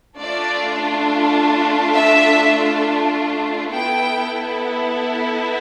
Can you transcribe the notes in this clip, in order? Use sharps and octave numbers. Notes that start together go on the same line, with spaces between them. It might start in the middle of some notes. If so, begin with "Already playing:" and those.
A3 D4 F4 D5
E5
B3 E4 A4 G5